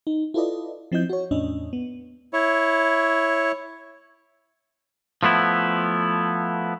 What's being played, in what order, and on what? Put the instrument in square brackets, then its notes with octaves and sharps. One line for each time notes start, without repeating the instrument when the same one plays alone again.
[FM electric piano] D#4
E4 F4 A4 B4 D5 D#5
F3 C4 E4 D#5 G6
F#4 C#5
E2 A2 C#4 D4 D#5
B3
[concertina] E4 C#5
[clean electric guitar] F3 A3 B3 E4